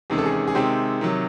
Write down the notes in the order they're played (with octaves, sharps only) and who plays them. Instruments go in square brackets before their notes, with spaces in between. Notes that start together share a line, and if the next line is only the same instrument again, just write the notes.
[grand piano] E2 C3 D#3 G#3 C#4 G#4
A4
G#4
G#4
C3 D#3 G#3 C4 G4
C3 D#3 F#3